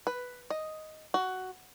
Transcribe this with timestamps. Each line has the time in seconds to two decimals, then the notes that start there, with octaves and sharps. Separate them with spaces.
0.07 B4
0.50 D#5
1.14 F#4